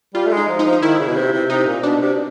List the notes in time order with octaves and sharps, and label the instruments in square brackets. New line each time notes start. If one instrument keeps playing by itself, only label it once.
[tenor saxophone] G3 [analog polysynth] F4
[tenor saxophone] A3
G#3
[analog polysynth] D#4
[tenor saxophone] F3
[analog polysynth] D#4
[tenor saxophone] F3
[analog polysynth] D#4
[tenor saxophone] D#3 [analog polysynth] E4
[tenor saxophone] C#3
B2
C3
C3
[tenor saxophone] C3 [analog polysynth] D#4
[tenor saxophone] A#2
[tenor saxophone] B2 [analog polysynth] D4
[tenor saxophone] C3